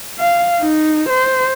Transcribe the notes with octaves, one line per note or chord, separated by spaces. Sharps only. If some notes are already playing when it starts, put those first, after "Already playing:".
F5
D#4
C5